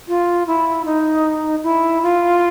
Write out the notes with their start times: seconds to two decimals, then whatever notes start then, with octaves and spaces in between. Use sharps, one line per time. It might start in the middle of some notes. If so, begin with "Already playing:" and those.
0.08 F4
0.47 E4
0.85 D#4
1.63 E4
2.03 F4